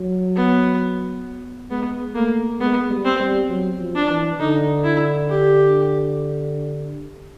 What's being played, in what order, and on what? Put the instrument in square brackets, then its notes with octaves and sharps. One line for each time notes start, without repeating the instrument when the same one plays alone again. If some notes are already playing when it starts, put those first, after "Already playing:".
Already playing: [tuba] F#3
[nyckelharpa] B3
[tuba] G#3 [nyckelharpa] B3
[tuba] A3 [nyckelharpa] A#3
[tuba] G#3 [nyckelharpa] B3
[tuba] G3
[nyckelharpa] C4
[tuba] G3
F#3
F3
[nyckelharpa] D4
[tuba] E3
[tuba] D3 [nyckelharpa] D#4
[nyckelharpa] E4
G4